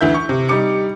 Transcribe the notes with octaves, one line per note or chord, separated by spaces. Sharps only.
D2 E3 E5 G6
C#6
C3
G3 D#4 D6 C#7